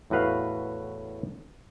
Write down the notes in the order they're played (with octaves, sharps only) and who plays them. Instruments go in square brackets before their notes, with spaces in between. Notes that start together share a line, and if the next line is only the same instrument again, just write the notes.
[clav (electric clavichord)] E2 A2 F#4 B4 F5